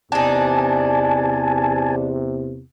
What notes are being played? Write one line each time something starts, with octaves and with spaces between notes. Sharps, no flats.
E2 C3 D4 D#4 G#5 A5